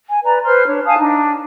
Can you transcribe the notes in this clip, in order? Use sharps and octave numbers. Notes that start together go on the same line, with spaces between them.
G#5
B4 D5 A#5
B4 C5 C6 F6
D4 C#5
F5 G#5 A5 D#6
D4 D#4